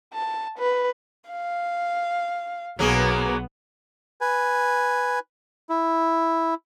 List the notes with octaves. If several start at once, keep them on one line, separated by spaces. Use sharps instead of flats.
A5
B4
F5
B1 F#3 A#3 B3 G#4
B4 G#5
E4